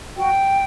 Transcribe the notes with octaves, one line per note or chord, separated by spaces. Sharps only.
F#4 G5